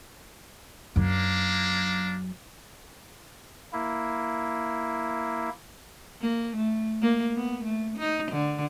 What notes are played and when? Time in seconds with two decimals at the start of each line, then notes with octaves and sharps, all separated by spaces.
0.96 F#2 F#3 A#3 D4
3.73 A#3 E4
6.22 A#3
6.56 A3
7.02 A#3
7.36 B3
7.64 A3
7.98 D#4
8.32 D3